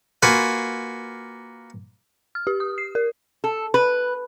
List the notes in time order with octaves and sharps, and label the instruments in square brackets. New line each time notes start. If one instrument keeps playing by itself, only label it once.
[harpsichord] A#3 F4 F#4 B4 G#5
[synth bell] F6
G4
D#6
C7
A#4
[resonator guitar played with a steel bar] A4
B4